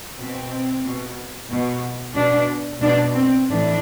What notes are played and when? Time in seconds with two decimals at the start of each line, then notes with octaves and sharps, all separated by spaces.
0.18 B2 C4
0.84 B2
1.50 B2
2.15 B2 D4
2.81 B2 D4
3.14 C4
3.47 A2 E3 D4